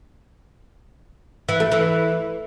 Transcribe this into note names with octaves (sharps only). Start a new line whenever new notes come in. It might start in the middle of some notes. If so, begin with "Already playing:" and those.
E3
A3
E3